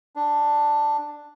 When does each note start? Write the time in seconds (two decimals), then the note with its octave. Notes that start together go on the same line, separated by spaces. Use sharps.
0.16 D4